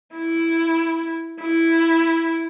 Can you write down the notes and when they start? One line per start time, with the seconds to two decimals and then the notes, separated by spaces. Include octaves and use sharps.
0.16 E4
1.41 E4